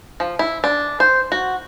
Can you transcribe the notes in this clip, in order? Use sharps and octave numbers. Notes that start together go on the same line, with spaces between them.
F3
E4
D4
C5
F#4